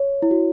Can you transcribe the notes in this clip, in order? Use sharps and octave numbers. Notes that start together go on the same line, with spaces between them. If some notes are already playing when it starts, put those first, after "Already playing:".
Already playing: C#5
E4
F#4